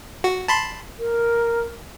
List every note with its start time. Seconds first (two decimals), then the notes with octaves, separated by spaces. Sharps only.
0.24 F#4
0.48 A5 B5 C6
0.99 A#4